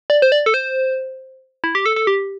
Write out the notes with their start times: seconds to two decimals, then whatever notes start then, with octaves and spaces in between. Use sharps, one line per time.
0.10 D5
0.22 C5
0.32 D5
0.46 A4
0.54 C5
1.64 E4
1.75 G4
1.86 A4
1.96 A4
2.07 G4